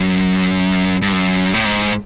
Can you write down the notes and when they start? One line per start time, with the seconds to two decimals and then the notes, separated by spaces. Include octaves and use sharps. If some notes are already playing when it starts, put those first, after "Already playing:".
Already playing: F#2
1.02 G2
1.13 F#2
1.54 A2
1.65 G#2